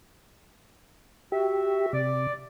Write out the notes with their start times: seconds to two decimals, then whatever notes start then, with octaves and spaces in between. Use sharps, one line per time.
1.32 F#4 G4 E5
1.93 C3 D5